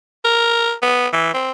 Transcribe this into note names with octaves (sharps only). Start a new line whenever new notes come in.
A#4
B3
E3
C4